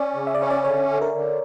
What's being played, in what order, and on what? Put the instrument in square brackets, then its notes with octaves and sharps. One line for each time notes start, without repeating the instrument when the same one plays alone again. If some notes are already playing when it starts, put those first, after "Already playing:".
Already playing: [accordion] C#4 [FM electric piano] D5
[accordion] C#3
[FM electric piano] E5
D5
[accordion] C#4 [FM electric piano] C#5
[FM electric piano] D5
[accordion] D3 [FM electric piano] C#5
[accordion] D3
[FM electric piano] A#4
[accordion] D3